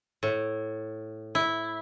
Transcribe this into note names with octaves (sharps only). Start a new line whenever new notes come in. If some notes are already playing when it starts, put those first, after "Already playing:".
A2
E4